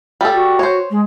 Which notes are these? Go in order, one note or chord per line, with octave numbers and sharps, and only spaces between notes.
G3 A4
F#4
C5 C#5
G#3